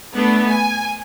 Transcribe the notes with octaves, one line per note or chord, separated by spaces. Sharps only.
A3 B3 D4
G#5